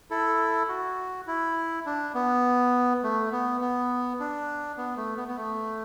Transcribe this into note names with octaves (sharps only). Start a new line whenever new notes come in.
E4 A4
F#4
E4
D4
B3
A3
B3
B3
D4
B3
A3
B3
B3
A3